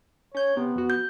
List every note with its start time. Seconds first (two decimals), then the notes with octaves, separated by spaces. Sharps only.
0.35 C#4 C#5 G6
0.57 C3 B3
0.75 F2 F#4
0.90 G6